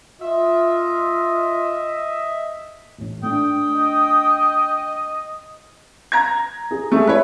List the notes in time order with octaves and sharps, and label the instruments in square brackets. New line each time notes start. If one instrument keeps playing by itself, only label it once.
[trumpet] F4 [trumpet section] D#5 [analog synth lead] E5
[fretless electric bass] A1 A2
[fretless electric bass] A3 D4 [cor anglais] G5 [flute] D#6
[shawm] D#5
[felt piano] A#5 G#6
[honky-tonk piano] G#4
[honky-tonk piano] G#3 G#4 [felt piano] A3
[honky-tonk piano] E4 [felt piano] B4 C#5